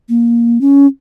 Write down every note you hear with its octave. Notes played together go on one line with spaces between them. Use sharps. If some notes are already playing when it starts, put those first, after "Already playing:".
A#3
C#4